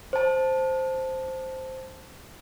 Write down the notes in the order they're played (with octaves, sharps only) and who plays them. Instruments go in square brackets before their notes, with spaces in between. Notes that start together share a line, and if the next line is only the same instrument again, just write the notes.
[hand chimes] C5 A5